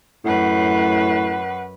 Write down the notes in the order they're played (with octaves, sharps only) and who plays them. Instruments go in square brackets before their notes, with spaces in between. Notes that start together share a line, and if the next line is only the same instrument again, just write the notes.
[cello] F#2 B4 [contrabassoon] A2 [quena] F#5